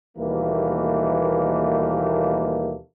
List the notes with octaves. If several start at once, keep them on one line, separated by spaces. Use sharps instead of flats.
D#2 B2 E3 G3 A3 A#3